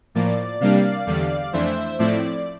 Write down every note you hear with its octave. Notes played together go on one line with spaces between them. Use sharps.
A2 F3 A#3 D5
C3 G3 A#3 D4 D5 F5
E2 D3 G3 D5 F5
F2 E3 A3 D4 C5 E5
A2 F3 A3 C4 E4 D5